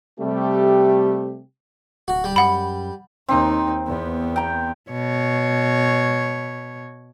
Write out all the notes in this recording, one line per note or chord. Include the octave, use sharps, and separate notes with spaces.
C3 G3 A3 G4
D1 F#4
G3
F#2 F#5 B5
D#2 C4 D#4
E2 B3
G5 A#5
B2 C#5